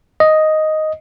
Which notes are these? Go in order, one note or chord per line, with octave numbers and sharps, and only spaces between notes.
D#5